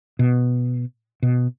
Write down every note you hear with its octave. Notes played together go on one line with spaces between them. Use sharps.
B2
B2